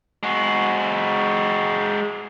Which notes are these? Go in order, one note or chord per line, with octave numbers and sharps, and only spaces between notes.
G#3 F#4